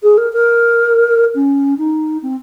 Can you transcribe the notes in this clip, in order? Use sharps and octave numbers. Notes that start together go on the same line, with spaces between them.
G#4
A#4
A#4
C#4
D#4
C4